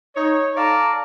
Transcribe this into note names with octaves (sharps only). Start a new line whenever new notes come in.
D#4 C#5
A4 D5 F5 A5 A#5